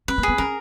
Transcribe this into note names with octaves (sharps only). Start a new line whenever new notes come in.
C#4 B4
A#3
B3 G#4
C#4 A#4